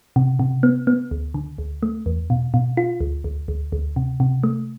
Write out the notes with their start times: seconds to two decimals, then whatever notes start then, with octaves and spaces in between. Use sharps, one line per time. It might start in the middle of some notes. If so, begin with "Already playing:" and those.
0.16 C3
0.39 C3
0.63 B3
0.87 B3
1.11 D2
1.34 D3
1.58 D2
1.83 A3
2.06 E2
2.30 B2
2.54 B2
2.77 F4
3.01 D2
3.24 D2
3.48 D2
3.72 D2
3.96 C3
4.20 C3
4.44 A3